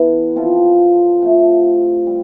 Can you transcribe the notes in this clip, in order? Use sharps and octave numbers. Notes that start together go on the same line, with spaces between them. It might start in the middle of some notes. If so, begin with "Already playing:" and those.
Already playing: E3 B3 E4 A4
F3 C4 F4 A4
C3 F3 A3
G3